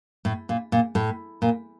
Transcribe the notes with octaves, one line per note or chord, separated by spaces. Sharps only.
A2
A#2
A#2
A2
A#2